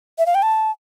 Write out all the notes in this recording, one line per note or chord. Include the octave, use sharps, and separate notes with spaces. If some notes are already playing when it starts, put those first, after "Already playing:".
E5
F5
G5
A5